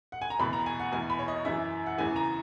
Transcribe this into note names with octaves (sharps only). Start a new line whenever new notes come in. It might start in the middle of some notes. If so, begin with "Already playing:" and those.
F#5
G#5
A#5
E2 B2 B5
A#5
G#5
F#5
E2 B2 G#5
B5
C#5
D#5
F#2 E3 E5
F#5
E2 C#3 E3 G#5
A#5